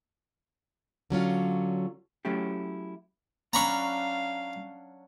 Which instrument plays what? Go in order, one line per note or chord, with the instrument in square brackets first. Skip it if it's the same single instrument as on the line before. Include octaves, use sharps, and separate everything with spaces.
[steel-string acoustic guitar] D3 F#3 C#4 F4
[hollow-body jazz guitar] F#3 A3 C#4 E4 G4
[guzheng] F#3 C#4 D4 [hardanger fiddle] F5 [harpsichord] A#5 B5 C#6